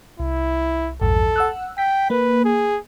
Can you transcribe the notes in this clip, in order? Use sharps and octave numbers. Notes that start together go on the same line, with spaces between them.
C2 E4
A#1 E2 G2 A4
F#5 E6 F#6
G5 B6
A#3 B4
G#4